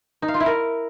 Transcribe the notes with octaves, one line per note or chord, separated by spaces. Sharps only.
D#4
F5
F4
E4
A#4